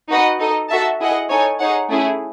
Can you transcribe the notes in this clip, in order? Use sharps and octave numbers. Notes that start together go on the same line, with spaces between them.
D#4 F#4 B4 D#5 F#5
D#4 A4 D#5
F#4 A4 E5 A5
E4 G#4 D#5 F#5
D#4 A4 C#5 G#5
D#4 G#4 C#5 F#5
A3 C#4 E4 G#4